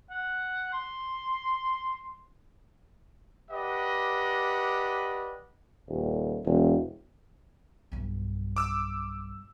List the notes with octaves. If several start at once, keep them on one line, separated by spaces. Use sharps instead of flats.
F#5
C6
G4 B4 D5 D#5 F#5
D#1
E1
B1 G2
D6 E6